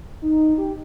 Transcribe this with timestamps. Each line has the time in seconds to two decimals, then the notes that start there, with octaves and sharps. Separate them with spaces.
0.22 D#4
0.58 G4